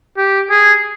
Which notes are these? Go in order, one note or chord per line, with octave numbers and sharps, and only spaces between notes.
G4
G#4